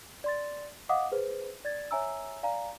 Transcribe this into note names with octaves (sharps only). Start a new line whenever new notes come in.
D5 C6 A6
D#5 F5 F#5 D6 D#6
G#4 B4 C5
D5 G#6 A6
C#5 E5 G#5 A#5 E6
D5 F5 G#5 A#5